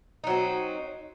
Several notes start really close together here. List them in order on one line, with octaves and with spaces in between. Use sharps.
D#4 F#3 C4